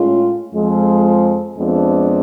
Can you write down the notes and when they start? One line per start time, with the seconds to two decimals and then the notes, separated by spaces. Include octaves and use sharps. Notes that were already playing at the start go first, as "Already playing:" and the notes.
Already playing: A2 G#3 C#4 F4
0.54 F2 F3 G#3
1.57 F2 F3 G#3 B3 D4